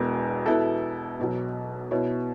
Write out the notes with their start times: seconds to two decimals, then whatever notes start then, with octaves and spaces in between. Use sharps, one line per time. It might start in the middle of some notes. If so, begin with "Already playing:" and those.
Already playing: E1 E2 B2 B3
0.46 B2 B3 E4 A4
1.19 B1 B2 F#3
1.91 B2 B3 E4 C#5